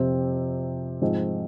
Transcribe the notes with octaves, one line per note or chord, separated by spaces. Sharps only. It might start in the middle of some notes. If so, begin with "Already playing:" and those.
Already playing: F2 C3 F3 C4
G#2 F3 G#3 C4